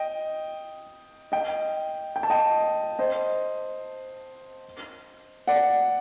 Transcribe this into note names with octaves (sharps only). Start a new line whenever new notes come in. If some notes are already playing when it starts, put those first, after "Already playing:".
Already playing: D#5 G5
D#5 G5
G5
A5
D#5 G5
C5 D#5
D5 F#5